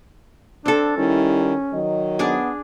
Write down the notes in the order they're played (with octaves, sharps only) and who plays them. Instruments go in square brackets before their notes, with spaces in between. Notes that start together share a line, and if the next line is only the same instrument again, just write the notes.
[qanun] C4 A4 [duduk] D4
[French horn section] D#3 G3 E4 [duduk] C#4
[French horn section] D#3 F#3 D#5
[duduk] B3 [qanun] D4 G#4 G#5